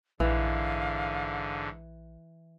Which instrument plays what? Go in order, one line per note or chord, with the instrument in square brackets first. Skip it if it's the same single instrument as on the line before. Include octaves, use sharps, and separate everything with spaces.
[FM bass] A#1 [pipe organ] G#2 D3 [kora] E3 [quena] F5